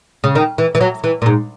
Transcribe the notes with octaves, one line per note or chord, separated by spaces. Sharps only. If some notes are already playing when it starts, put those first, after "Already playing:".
C#3
D#3
E3
E3
F#3
E3
A#2
G#2